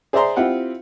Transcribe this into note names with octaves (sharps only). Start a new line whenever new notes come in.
G#4 C5 D5 E5 A#5 C6
C4 E4 F4 G4 F#5